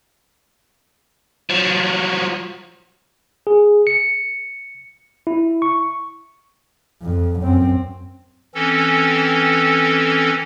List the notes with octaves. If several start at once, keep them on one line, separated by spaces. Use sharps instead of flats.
F3 F#3
G#4
C#7
E4
C#6
F2
F#2 C4
E3 C4 C#4 A4